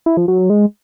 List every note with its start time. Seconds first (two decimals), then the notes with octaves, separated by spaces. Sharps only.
0.06 E4
0.17 F3
0.28 F#3
0.39 F#3
0.50 G#3